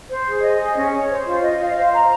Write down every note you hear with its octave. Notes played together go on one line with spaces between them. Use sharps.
C5
G#4
D#5
G#4
C#4
C#5
C5
F4
D#5
F5
C5
A#5